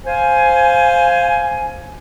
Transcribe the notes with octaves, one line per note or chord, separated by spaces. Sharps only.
C5 F5 G#5